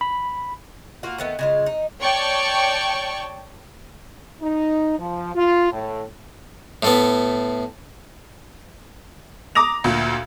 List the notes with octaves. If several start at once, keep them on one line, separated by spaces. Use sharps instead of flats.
B5
A#3 F4 F#4
D#3 A3 B3
C#3 G#3 F4
D#4
C#5 D5 G5 A5 C#6
D#4
F3
F4
A2
A2 A3 B3
A#5 D6 D#6 A#6 F7
D2 A#2